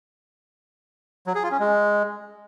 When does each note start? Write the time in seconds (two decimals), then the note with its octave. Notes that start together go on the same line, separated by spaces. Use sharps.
1.27 F#3
1.35 G#4
1.43 F4
1.51 C#4
1.60 G#3